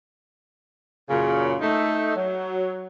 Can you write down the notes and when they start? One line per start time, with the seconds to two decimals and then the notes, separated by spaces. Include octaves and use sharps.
1.09 F#2 A#2 C#3
1.61 A3 D#4
2.15 F#3